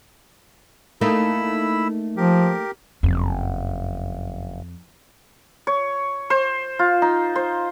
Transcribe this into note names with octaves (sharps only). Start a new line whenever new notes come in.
A3 A#3 D#4 E4 B5 E6
F3 G4 A#4
F#1 F2
C#5
C5
F4
D#4
C5